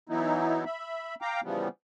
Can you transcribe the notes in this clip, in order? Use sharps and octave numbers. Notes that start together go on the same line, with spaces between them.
E3 F#3 B3 D#4 E4
E5 B5
F5 G5 A#5 D6
C#3 E3 F3 G3 B3